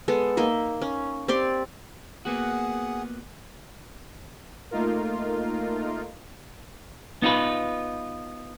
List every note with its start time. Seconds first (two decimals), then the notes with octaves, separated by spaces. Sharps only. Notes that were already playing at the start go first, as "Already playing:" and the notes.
0.08 G#3 B3 A4
0.37 A#3 D#4 D#5 E5
0.82 C#4
1.28 C4 G4 D5 C6
2.25 A#3 B3 F#4 G#4 F#5
4.71 A3 A#3 D#4 F4 A#4
7.22 B3 D#4 F4 B4